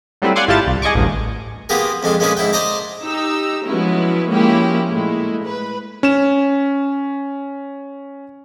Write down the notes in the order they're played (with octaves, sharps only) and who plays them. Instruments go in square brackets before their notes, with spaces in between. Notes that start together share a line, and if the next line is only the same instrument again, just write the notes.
[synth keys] F#3 G3 A3 C4 E4 B4
D5 F5 F#5 G#5 C6 D6
G#1 E4 F4 G4 A5 A6
C2
G#4 D#5 G#5 C#6 D6
A1 D2 G2
[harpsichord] A#3 B3 F4 G4 G#4 A#4
F2 G#3 D4 F4
G#3 A#3 C#4 D4 G#4 B4
G#2 E4 G5
C5 D5 D#5 A5 A#5 D6
[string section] D#4 G4 A#5 E6
F3 F#3 G#3 B3 C#4 E4
F3 G#3 A#3 C#4 E4 G4
A#2 G#3 A3 E4
B4
[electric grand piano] C#4 E7